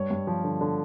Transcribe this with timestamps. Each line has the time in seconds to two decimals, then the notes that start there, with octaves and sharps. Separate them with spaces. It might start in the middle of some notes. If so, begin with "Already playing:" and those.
Already playing: G2 C#5
0.11 G2
0.27 F3
0.44 D3
0.61 D3